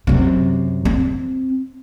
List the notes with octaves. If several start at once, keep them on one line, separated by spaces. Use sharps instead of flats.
F#2 C3
C4